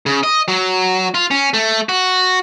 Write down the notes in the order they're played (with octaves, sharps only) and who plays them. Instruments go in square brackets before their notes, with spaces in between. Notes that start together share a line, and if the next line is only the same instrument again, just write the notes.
[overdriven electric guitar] C#3
D#5
F#3
F4
C#4
A3
F#4